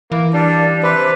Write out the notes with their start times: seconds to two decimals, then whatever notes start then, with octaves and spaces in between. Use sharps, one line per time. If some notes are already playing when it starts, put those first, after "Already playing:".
0.12 E3 A#3
0.34 G3 D4
0.83 C3 B4